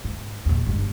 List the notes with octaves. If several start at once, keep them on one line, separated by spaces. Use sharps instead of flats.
G#2
E2 A#2
G1 G#3